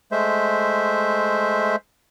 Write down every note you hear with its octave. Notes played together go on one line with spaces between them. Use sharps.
G#3 A3 C5 E5